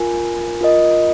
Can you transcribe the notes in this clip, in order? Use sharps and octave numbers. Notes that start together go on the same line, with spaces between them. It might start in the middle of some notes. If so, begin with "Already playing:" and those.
Already playing: F4 A#4 G#5
F4 A#4 D#5